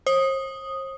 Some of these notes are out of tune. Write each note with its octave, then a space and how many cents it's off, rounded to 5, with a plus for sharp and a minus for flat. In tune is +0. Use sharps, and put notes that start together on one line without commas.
C5 +45 D#6 +0